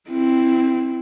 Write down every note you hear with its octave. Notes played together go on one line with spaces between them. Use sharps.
C4 E4